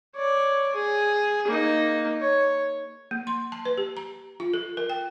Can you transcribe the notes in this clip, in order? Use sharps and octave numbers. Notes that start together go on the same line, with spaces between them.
C#5 D5
G#4
A#3 D#4
C#5
A#3
C6
A5
B4
G4
A#5
F4
A4
A#4
G5